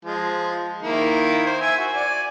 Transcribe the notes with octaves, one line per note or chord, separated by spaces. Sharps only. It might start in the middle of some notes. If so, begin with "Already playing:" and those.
F3 G#3
D#3 A#3 E4
C5
E5 G#5
F#4
D5 G#5